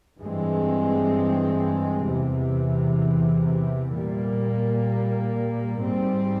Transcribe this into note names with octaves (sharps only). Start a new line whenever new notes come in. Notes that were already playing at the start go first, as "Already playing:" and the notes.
G2 E3 G#3 C4
E2 C3 E3
A#2 G3 A#3
G#2 G3 C4